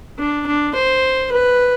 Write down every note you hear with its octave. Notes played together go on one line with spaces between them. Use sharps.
D4
D4
C5
B4